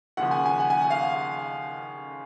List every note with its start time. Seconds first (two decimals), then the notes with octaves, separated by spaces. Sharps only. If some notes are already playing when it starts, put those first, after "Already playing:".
0.17 D#2 C#3 F3 F#5
0.31 G#5
0.46 G#5
0.60 F#5
0.70 G#5
0.81 F#5
0.90 F5